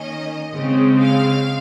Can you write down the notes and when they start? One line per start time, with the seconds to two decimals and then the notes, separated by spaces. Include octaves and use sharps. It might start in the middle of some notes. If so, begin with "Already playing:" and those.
Already playing: D#3 A#3 C#4 D#5
0.53 C#3 G#3 C4
1.00 F5